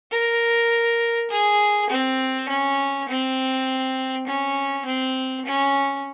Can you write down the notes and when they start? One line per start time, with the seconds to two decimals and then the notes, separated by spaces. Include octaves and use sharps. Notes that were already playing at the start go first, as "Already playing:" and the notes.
0.11 A#4
1.30 G#4
1.90 C4
2.48 C#4
3.08 C4
4.27 C#4
4.86 C4
5.45 C#4